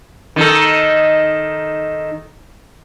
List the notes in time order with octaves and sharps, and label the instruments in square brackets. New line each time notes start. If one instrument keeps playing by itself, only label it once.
[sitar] D#3 D#4 A4